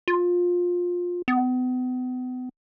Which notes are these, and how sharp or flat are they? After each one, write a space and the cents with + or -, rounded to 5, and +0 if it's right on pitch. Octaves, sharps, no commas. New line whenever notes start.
F4 +20
B3 +40